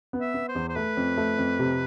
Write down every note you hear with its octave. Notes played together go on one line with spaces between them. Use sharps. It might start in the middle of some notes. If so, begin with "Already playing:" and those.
B3
E5
B3
C5
E2
C5
A3 B4
F2
A3
F2
C3